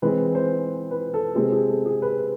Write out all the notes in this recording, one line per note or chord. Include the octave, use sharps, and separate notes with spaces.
E3 G#3 C4 B4
C5
B4
A4
C3 G#3 C4 G#4
G#4
A4
G#4
B4